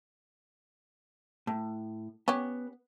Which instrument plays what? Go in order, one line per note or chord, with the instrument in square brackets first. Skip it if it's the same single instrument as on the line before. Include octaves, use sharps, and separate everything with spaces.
[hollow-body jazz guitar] A2
[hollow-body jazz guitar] B3 [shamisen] C#4 G4